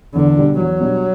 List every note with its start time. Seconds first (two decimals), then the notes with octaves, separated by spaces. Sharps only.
0.15 E2 D3
0.37 B2 G3 D4
0.59 E2 F#3
0.81 B2 G3 D4